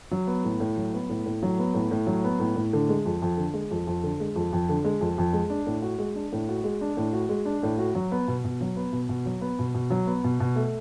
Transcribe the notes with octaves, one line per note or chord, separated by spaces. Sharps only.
F#3
B3
A2
A2
F#3
B3
A2
A2
F#3
B3
A2
A2
F#3
B3
A2
A2
D3
G#3
F2
F2
D3
G#3
F2
F2
D3
G#3
F2
F2
D3
G#3
F2
F2
G#3
D4
A2
F#4
G#3
D4
A2
F#4
G#3
D4
A2
F#4
G#3
D4
A2
F#4
F#3
B3
B2
B2
F#3
B3
B2
B2
F#3
B3
B2
B2
F#3
B3
B2
B2
A3